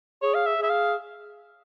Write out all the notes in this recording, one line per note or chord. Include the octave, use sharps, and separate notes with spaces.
G#4 C#5
F5
E5
G#4
E5
F5